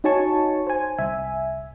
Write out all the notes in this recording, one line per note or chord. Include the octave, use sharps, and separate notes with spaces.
D#4 F#4 C#5 G#5 A5 C#6
C5 G#5
C2 E5 G#5